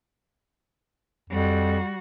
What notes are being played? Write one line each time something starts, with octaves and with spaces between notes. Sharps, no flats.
F2 G3 F#4